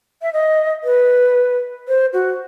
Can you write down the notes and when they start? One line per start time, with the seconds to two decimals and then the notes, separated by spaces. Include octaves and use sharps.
0.22 E5
0.33 D#5
0.84 B4
1.88 C5
2.13 F#4